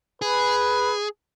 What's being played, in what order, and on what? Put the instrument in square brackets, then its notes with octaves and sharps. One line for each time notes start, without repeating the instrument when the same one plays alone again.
[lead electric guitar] G#4 [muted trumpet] B4